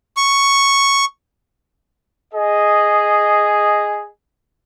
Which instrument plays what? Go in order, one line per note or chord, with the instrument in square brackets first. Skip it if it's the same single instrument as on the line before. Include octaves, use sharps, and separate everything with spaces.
[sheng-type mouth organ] C#6
[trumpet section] G#4 D#5